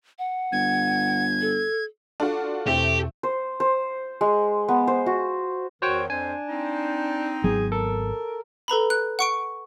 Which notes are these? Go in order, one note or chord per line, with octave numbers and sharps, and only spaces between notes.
F#5
G1 G#6
A4
D4 F4 F#4 A4
E2 B2 A3 C4 G4
C5
C5
G#3
B3
C5
F#4
E2 D#3 F#4 C5 C#5 G5
F2 C4 D4 C5 G#5
C4 D#4
G#1 F#3 B3 G#4
A4 A#4
A4 B4 A#5 B5
F#6
F#5 C#6 D7